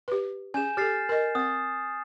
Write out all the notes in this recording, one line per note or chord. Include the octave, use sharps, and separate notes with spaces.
G4 B4
C#4 G#4 G#5 G6 E7
G4 A4 F6 A6 C7
A#4 D#5
C4 D#6 A6